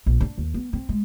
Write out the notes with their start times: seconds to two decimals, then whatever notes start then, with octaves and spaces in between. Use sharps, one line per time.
0.06 A#1
0.21 D4
0.38 D#2
0.54 B3
0.73 C4
0.89 G#3